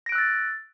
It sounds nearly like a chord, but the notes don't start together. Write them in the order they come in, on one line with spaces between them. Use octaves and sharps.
A#6 D7 F#6 E6 A6